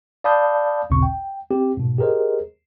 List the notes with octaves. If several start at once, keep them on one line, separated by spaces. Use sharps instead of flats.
D5 F5 A5 B5 D#6 G6
A1 D#2 A#2 C#3 C4 C#6
G5
C4 G4
G#2 B2
G4 G#4 A#4 C5 D#5